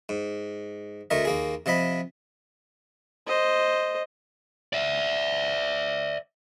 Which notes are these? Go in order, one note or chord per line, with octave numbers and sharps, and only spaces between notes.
G#2
D2 A3 A#4 D#5
D#2 A#3 G#4
C3 F3 D#5 B5
C5 D#5
D5 E5